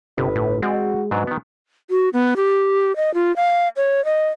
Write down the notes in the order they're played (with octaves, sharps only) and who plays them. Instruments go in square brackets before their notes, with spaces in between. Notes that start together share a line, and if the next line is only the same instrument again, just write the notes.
[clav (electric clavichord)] G1 [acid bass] C3 [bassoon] B4
[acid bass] A2
[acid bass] G#3 [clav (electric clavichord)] C4 D5 [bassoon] F#4
[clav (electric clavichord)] G#2 F#3 D4 [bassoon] B2
[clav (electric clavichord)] D#3 B3
[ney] F#4
B3
G4
D#5
F4
F5
C#5
D#5